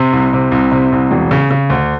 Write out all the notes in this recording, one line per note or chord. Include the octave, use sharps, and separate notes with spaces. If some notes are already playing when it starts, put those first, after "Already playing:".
Already playing: C3
C2
C3
C2
C3
C2
E1
C#3
C#3
D2